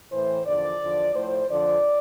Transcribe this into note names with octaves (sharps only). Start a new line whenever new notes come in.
A2 E3 C5
E2 D3 F3 D5
E2 D3 F3
A2 F3 C5
F2 D3 F3 D5